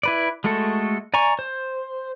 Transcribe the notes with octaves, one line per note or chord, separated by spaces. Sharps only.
E4 B4 D5
G#3 A3 F#4 A4
D5 G#5 A#5 C#6
C5